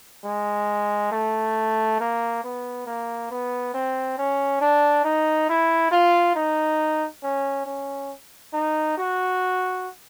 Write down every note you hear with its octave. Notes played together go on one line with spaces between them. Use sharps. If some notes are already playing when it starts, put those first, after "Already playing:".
G#3
A3
A#3
B3
A#3
B3
C4
C#4
D4
D#4
E4
F4
D#4
C#4
C#4
D#4
F#4